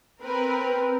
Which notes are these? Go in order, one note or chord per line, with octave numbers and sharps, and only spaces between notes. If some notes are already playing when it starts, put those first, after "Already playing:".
C4 A#4 B4